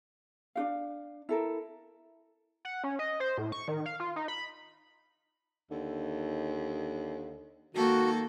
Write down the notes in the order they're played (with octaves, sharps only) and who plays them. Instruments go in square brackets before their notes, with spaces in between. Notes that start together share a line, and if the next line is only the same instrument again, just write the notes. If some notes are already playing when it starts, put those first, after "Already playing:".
[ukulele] D4 F#4 F5
E4 A4 A#4
[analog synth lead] F#5
C#4
D#5
C5
A2
C#6
D#3
F5
F4
D#4
B5
[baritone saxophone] D#2 [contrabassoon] D3
[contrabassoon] G#2 [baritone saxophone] D#3 [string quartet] A#3 A4 [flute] F#4